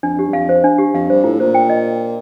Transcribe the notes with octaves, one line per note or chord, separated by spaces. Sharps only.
F2 D4
G4
G2
F2 F5
C5
D4
G4
F2 F5
G2 C5
A2 F4
A#2 C5
G5
D#5